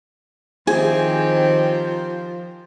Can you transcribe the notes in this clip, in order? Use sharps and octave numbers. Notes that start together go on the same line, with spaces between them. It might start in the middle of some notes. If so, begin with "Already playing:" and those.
D#3 F3 C4 E4 G4 G#4 G#5